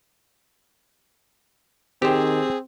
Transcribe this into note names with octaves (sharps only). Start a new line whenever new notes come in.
D#3 C4 G4 G#4 C5